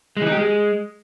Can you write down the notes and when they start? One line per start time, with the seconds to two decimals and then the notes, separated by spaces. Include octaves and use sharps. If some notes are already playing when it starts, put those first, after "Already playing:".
0.17 G#3
0.22 E3
0.27 D#4
0.32 G4
0.37 G#3